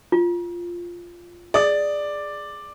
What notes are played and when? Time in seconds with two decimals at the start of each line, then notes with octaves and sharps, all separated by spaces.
0.12 F4
1.54 G#4 D5 D#5 D#6